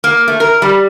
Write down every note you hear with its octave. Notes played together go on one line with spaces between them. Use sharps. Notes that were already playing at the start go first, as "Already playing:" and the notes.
A#3
A3
A#4
G3